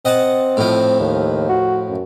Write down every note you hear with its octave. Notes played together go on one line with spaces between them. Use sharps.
C4 D#5 F#5 A5
A2 F3
D#2
F#4
F#2